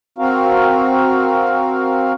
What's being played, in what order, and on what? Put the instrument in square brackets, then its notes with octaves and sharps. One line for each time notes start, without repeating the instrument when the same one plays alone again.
[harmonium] C4 F#4 A#4 F5